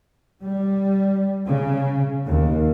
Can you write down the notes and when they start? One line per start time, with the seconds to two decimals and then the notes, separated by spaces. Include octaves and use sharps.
0.45 G3
1.46 C#3
2.27 D#2